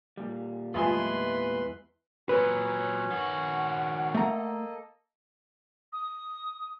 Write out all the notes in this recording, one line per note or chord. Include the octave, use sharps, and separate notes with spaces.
A#2 G3
E2 G#3 A3 F4 G#4 B4 G#5 C6
A#2 F#3 C#4 B4
D#3 F#4 F#5
A3 A#3 A4 D#5 A#5
D#6